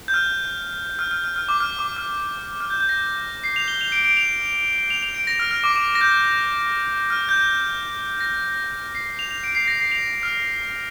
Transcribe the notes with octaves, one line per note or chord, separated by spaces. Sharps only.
G6
F6
F6
F6
F6
F6
D6
F6
D6
F6
F6
G6
G6
A#6
C7
F7
G7
F7
D7
D7
F7
F7
F7
D7
A#6
F6
F6
D6
D6
A#6
G6
F6
G6
A#6
C7
F7
F7
D7
C7
A#6
C7
F7
F6